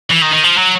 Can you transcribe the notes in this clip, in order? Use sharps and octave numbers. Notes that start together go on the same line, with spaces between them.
E3
D#3
D#3
F3
F#3